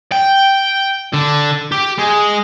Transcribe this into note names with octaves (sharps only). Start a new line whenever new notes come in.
G5
D3
G4
G#3